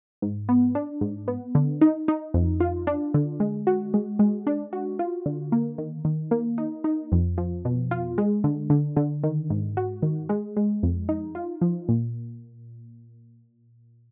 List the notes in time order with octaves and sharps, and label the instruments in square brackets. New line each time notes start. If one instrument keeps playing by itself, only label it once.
[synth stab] G#2
B3
D4
G#2
B3
D3
D#4
D#4
F2
F4
D4
D3
G#3
F#4
G#3
G#3
D4
F#4
F4
D3
A#3
D#3
D#3
A#3
D#4
D#4
F2
F3
B2
F4
G#3
D3
D3
D3
D#3
G#2
F#4
D#3
G#3
G#3
F2
D#4
F4
F3
A#2